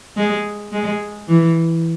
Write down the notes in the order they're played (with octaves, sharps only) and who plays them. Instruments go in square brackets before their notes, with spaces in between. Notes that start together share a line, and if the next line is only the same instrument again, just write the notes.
[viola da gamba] G#3
G#3
E3